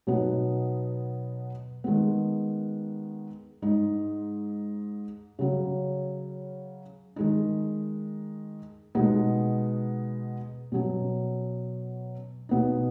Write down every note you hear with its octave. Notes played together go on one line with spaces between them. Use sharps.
B2 F#3 B3 D#4
D#3 G#3 B3
G#2 G#3 D#4
C#3 F#3 C#4
D#3 G#3 D#4
B2 G#3 B3 D#4
B2 F#3 C#4
B2 B3 D#4